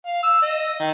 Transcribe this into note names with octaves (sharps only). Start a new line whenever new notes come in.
F5
E6
D#5
D#3